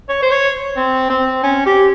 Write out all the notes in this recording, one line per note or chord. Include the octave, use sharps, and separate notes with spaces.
C#5
C5
C#5
C4
C4
C#4
G4